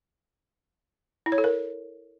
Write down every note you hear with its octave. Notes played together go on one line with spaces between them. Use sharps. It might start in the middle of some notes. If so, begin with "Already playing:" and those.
E4
C#5
A4
A#4